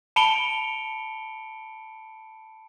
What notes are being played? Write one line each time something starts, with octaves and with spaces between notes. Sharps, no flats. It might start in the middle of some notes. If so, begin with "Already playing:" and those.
A5 B5 C#7 D7 F7 G7